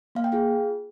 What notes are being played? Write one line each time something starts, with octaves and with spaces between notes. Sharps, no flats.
A#3 F5
G5
F4 G#4 F5